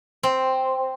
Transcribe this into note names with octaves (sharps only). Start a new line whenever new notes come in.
C4